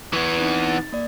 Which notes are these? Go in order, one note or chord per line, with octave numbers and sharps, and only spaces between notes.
E3 B3 C#6 G#6
C4 D#4
A6
A#3 D5